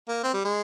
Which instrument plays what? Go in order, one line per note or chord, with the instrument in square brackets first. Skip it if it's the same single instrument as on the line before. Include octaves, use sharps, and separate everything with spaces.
[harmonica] A#3
C4
G3
G#3